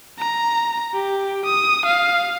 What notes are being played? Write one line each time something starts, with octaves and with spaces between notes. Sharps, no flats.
A#5
G4
D#6
F5